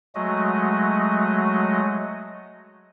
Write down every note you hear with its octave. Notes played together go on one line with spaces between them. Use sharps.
F#3 G#3 A3 F#4 D#5